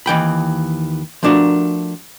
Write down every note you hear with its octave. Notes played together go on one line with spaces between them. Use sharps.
D#2 E3 G5 B5
F3 A3 D4 F#4 A#4